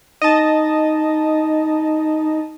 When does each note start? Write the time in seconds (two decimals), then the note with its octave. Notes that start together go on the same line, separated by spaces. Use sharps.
0.22 D#4 D#5 A5